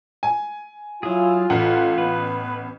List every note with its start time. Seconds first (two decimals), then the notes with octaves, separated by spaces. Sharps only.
0.23 G#5
1.03 F#3 E4 F4 G#4
1.50 A1 A4 B4 F#5
1.98 B3 B4